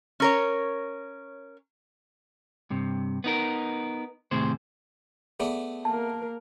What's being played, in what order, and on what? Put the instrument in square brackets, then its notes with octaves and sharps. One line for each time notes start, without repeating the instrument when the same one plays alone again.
[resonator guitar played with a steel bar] C#4 A#4 C#5
[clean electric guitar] G2 C3
B3 D#4 A#4
D#2 A2 C3 G#4 C5
[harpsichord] A3 B3 D5 [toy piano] G#4
[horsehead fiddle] A#3 A#4 [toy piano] A5